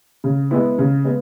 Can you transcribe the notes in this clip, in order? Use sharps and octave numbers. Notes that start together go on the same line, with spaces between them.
C#3
G#3 B3 E4
C#3
G#3 B3